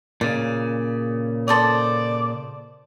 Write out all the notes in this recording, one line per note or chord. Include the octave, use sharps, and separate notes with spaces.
A#2 C#3 D5
A4 C5 D5 D#6